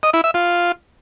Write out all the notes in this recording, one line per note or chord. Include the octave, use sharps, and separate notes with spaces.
D#5
E4
E5
F4